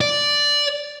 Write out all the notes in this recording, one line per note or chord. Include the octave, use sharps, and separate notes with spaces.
D5